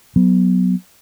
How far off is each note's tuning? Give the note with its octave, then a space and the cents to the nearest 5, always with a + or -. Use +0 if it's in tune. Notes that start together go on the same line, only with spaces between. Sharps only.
F#3 +0 B3 +0